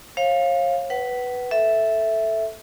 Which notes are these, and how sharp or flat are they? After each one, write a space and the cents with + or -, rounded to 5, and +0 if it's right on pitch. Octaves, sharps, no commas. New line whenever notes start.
C#5 -40 F5 +0
B4 +0 F#5 +30
A4 +0 E5 +0